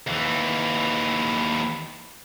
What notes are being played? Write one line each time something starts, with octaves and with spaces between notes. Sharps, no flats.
D#2 E3